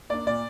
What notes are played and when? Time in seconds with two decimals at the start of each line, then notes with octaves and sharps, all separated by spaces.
0.10 A#3 D4 D5
0.27 A#2 D5